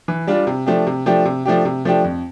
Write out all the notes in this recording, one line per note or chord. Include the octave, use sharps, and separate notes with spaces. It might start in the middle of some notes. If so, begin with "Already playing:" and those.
E3
G3 D4 F4
C3
F3 A3 D4 G4
C3
F3 A3 D4 G4
C3
F3 A3 D4 G4
C3
F3 A3 D4 G4
F2